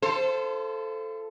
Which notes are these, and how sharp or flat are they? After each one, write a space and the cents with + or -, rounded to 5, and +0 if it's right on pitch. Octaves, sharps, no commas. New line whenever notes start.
F4 -40 A4 +0 C5 +0